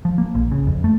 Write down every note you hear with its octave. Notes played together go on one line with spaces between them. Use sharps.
F3
A#3
A#1
C#3
F2
A3